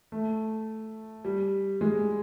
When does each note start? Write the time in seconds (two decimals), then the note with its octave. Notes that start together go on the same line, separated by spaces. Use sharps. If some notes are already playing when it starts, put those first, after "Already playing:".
0.12 A3
1.25 G3
1.81 G#3